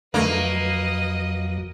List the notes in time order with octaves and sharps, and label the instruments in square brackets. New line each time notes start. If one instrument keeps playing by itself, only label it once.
[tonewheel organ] F2 F#3 [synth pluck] D3 A3 A#6 [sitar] A#3 [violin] B4 D#5